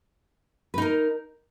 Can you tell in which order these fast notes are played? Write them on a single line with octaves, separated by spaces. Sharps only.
B4 D#4 A#4